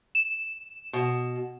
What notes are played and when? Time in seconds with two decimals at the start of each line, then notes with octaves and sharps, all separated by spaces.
0.15 E7
0.93 B2